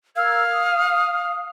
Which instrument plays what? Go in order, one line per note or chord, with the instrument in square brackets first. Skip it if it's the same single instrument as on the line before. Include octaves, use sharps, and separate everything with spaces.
[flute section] A#4 E6 G#6 [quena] F5
[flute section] D#6